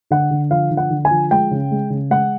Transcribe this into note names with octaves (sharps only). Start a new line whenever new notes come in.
D3 F#5
D3
F3 F5
D3
F#5
D3
G#5
F3
G#3 G5
C#3
G#3
C#3
G#3 F#5